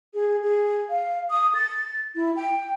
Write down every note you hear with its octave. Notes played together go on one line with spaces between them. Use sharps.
G#4
G#4
F5
D#6
A6
E4
G5